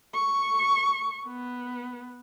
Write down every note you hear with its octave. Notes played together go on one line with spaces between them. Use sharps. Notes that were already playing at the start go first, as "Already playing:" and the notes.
C#6
B3